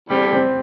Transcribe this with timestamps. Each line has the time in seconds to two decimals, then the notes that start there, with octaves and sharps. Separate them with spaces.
0.09 E2 D3 G3 C4
0.33 C4